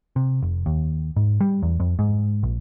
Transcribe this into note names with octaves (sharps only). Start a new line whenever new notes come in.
C3
F1
D#2
G#2
G3
E2
F2
G#2
A#1